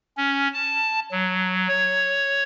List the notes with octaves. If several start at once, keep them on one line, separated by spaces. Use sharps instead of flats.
C#4
A5
F#3
C#5